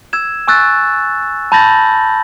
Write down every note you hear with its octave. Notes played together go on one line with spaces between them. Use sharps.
E6 G#6 E7
G#5 C#6 E6 F#6 A6
A5 B5 G6 A6 A#6 F#7